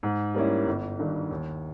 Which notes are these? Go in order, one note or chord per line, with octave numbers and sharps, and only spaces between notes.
G#2
G3 A#3 C#4 E4
G1
G2 D#3
D#2